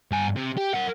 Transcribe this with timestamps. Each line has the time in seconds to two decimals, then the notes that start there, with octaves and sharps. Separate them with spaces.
0.11 G2 G#5
0.36 C3
0.57 G4
0.74 A#4 F#5